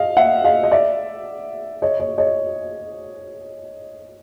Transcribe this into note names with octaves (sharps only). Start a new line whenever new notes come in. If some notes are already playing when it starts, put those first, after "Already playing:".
Already playing: D#5 F5
E5 F#5
D#5 F5
D#5
D5 E5
C#5 D#5
C#5 D#5
C#5 D#5